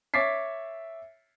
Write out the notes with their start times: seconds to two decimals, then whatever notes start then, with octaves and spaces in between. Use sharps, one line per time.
0.14 C#5 E5 D6 A6 B6 C7